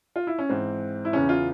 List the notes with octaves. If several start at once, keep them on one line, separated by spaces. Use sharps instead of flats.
F4
E4
C#4
G#2 E3 C4
E4
E2 C#3 E3 C#4
F4